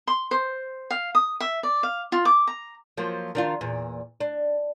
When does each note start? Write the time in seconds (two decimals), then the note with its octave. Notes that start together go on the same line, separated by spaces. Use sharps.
0.07 C6
0.31 C5
0.91 F5
1.15 D#6
1.40 E5
1.63 D5
1.83 F5
2.12 F4
2.25 D6
2.47 A#5
2.97 F3 F#3 A#3
3.35 D#3 D4 F4
3.61 E2 A#2
4.20 D4